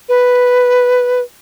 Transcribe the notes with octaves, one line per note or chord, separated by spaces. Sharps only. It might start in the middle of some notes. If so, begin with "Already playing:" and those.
B4